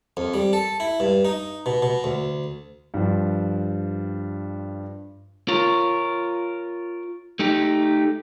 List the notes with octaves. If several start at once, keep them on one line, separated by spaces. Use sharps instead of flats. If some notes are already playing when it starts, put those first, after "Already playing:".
F2
G3
A4
E4
G2
D#4
B2
B2
D2
G2 F3
F4 A#4 C#5
A3 D#4 G4